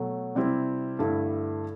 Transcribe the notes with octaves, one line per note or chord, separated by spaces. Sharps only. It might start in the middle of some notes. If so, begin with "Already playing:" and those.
Already playing: B2 F#3 A3
C3 G3 C4 E4
G2 D3 A3 E4